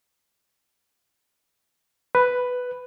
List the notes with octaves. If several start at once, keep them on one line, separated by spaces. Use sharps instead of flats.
B4